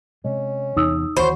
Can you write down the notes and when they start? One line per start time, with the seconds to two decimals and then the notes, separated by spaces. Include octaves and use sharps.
0.25 C3 G#3 C#4 D#5
0.76 E2 C3 D#4 D#6 E6
1.17 D#2 E3 F#3 C5 B5 C#6